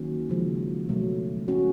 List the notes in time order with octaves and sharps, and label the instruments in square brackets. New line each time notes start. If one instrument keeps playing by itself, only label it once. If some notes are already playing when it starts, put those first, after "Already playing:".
Already playing: [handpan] D#3 F#3 A#3 C#4 F#4
C#3 F3 G#3
B2 F#3 A3
A3 C#4 F#4